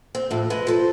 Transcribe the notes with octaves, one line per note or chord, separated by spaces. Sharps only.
C4
F2 A2
G#3 B4
F3 A4 C5